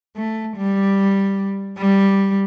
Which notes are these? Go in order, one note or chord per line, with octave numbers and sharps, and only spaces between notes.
A3
G3
G3